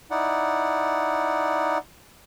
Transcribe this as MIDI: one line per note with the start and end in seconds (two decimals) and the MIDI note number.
0.11 1.78 63
0.11 1.78 64
0.11 1.78 74
0.11 1.78 78